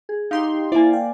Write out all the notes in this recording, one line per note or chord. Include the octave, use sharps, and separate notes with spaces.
G#4
D#4 G4 F5 C6
A#3 E4 C5 D5 G#5
F5 G5